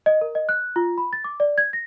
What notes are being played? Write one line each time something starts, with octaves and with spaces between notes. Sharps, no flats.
D#5
A#4
D#5
F#6
F4
B5
A6
D6
D5
G#6
A#6